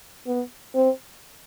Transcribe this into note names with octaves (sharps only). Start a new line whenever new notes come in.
B3
C4